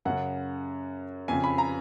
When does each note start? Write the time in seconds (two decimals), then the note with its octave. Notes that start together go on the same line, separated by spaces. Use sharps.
0.05 F#2 C#3 F#5
1.28 F2 C#3 G#5
1.44 B5
1.58 A#5